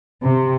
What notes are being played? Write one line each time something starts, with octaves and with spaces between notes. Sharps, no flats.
C3